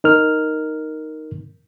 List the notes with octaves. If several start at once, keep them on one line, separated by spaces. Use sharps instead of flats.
D#4 A#4 F6